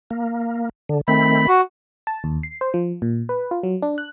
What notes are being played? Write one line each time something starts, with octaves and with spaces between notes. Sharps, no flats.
A#3
D3
D#3 A3 C4 B5
F#4
A5
D#2
C7
C5
F3
A#2
B4
F4
F#3
D4
F#6